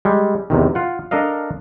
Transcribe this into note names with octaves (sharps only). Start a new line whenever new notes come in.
G3 G#3
E2 C3 D#3
F4 F#5
D4 A4 A#4 D#5 F5